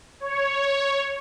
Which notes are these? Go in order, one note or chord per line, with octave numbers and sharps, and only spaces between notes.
C#5